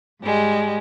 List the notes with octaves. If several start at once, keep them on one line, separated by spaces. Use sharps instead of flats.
G#2 G3 G#3